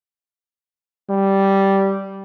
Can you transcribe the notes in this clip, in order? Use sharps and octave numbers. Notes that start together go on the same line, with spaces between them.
G3